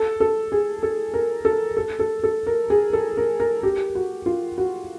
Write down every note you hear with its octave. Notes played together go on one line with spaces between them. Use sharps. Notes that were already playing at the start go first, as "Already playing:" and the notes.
Already playing: A4
A4
G#4
A4
A#4
A4
A4
A4
A4
A#4
G#4
A4
A#4
A#4
G4
F#4
F4
F#4